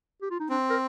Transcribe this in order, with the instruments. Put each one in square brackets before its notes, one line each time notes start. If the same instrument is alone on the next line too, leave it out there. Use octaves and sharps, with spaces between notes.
[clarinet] G4
F4
D#4
[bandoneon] C4 [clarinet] D4
[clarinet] A#4